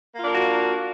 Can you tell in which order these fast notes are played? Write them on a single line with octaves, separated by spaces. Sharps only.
A#3 F4 D4 A#4 F#4